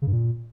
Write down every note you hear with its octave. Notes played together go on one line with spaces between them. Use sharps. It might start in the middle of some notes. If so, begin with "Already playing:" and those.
C#3
G2
A#2